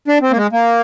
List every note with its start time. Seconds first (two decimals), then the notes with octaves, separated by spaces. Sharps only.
0.08 D4
0.22 C4
0.31 A#3
0.37 G#3
0.53 A#3